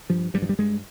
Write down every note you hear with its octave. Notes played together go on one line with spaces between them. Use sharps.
G2 F3
G2 G3
F3
G3
G2 G#3